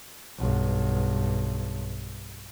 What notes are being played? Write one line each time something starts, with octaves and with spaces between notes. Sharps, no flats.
B1 G2